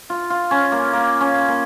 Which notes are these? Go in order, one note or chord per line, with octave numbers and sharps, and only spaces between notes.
F4
F4
C#4
A#3
A#3
C#4
A#3